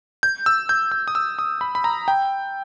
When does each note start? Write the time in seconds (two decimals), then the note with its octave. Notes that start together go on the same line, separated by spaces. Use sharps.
0.23 G6
0.46 E6
0.69 G6
0.91 E6
1.08 D#6
1.15 E6
1.39 D#6
1.61 B5
1.75 B5
1.84 A#5
2.08 G5